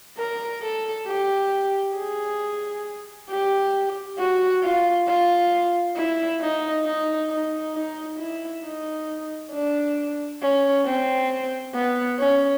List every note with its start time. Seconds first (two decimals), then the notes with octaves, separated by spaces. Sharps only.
0.18 A#4
0.62 A4
1.07 G4
1.96 G#4
3.30 G4
4.18 F#4
4.63 F4
5.07 F4
5.96 E4
6.41 D#4
6.85 D#4
7.29 D#4
7.75 D#4
8.18 E4
8.64 D#4
9.52 D4
10.42 C#4
10.85 C4
11.74 B3
12.19 C#4